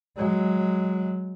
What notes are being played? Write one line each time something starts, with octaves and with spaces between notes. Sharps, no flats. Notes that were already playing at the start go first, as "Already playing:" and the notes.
F#3 G#3